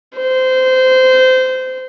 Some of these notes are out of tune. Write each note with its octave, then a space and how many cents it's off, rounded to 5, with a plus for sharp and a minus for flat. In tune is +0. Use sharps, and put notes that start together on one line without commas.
C5 -20